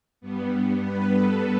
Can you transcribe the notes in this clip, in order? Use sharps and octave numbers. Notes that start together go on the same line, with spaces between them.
G2 G3 B3
B4
A4